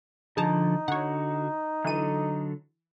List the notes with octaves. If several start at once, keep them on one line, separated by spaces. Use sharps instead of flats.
D3 F3 D#4 G#4 A5 A#5
D3 F#4 C#5 F#5
D3 E3 F#3 A4 D#7